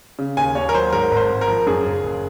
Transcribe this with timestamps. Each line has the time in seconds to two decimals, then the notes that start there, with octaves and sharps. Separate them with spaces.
0.19 C#3
0.37 D#2 G#5
0.55 D#2 C#5
0.69 A#4
0.74 F#3 C5
0.93 G#2 A#4
1.11 G#1
1.17 C5
1.30 G#1
1.41 A#4
1.48 F3
1.67 F#2 G#4
1.86 F#1
2.04 F#1